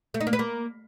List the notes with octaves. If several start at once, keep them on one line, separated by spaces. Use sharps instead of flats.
A3
D#4
A#3
B4
A#3